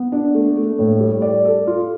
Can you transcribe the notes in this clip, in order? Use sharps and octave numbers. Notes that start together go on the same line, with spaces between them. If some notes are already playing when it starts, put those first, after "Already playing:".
Already playing: B3
D4
A3
A3
A2
G3
D5
A4
F4